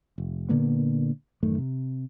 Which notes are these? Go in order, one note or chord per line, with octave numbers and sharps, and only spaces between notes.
F1
A#2 D3 A#3 B3
A1 F#2 D#3 A3
C3